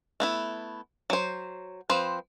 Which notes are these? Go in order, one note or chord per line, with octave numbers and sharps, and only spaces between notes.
A3 B3 E4
F#3 C5
F3 C4 B4 C5